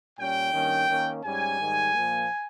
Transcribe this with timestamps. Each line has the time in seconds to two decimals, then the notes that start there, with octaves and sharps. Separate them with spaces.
0.18 A#2 G3 C#4 G5
0.53 G2 D#3 A#3 C#4
0.89 D#3 A#3 C#4
1.24 G#2 G3 C#4 G#5
1.59 G#2 D#3 G3
1.93 A#2 F3 A#3